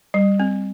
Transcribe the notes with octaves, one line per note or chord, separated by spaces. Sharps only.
G3
C4